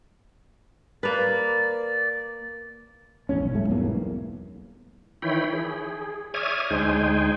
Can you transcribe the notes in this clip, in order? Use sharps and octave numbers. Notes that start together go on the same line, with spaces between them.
A#3 B4 D5
A#1 E2 A2 C#4
B1
G#2 G3 A3
E1 B1 E2 A#3
D#3 E3 E4 C#5 G5 B5
G#4
C#5 D5 E5 D#6 F6 G#6
D2 G#3 D#4 C5 G5 G#5